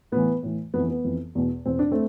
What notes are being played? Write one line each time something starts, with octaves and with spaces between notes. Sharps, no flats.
A2 E3 B3
A2 E3
F2 E3 B3
B3
F2 E3
E2 B2
E2 B2 C4
D4
A3 C4